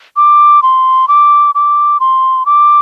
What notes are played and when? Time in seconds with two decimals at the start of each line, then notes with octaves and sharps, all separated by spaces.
0.17 D6
0.63 C6
1.08 D6
1.55 D6
2.00 C6
2.46 D6